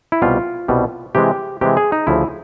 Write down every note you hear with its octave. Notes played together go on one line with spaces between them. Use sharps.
E4
C2 B2 G3 F4
C2 B2 G3
C3 E3 G#3 G4
C3 E3 G#3 G4
G#4
D#4
D2 C#3 F3 E4